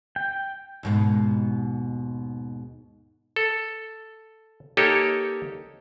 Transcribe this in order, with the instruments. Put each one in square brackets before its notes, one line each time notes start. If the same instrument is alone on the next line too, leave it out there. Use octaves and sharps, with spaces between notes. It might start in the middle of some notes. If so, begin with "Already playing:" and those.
[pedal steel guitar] G5
[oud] D#2 G#2 B2
[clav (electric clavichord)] A4
A#3 D#4 G4 A4 C#5